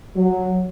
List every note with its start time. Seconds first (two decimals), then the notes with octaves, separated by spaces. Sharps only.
0.16 F#3